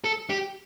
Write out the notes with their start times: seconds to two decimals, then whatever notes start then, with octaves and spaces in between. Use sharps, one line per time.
0.04 A4
0.30 G4